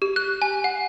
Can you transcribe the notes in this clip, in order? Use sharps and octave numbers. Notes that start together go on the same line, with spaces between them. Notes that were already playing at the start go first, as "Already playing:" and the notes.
G4
F#6
G#5
F#5